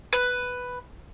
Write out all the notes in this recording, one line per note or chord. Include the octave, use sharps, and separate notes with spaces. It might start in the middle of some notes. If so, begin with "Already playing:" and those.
B4